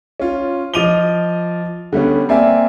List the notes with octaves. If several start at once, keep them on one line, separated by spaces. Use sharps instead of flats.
C#4 F4
F3 D#5 D6 D#7 F7 G7
D3 G3 B3 C#4
A#3 C4 D5 E5 G#5